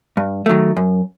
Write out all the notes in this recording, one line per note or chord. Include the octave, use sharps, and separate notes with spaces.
G2
D#3 F#3 A3
F#2